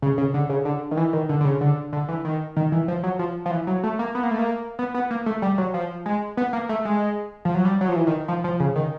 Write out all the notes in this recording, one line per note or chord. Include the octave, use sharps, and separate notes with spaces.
C#3
C#3
D3
C#3
D3
D#3
E3
D#3
D3
D3
C#3
D3
D3
E3
D#3
D#3
E3
F3
F#3
F3
F3
E3
F#3
A3
A#3
B3
A#3
A3
A#3
B3
B3
A#3
A3
G3
F#3
F3
G#3
B3
A#3
A3
G#3
F3
F#3
G3
F#3
F3
E3
D#3
F3
F3
C#3
D#3